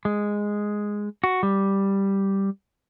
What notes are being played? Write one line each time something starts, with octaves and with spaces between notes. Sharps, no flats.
G#3
F#4
G3